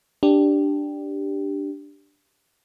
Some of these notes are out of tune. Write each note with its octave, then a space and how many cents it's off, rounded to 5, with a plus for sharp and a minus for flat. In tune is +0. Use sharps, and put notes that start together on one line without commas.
D4 +0 G4 +0